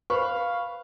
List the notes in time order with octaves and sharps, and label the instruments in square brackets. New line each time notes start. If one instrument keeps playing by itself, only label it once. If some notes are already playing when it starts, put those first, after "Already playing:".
[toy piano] B4 C5 [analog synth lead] F5 [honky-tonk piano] B5 C#6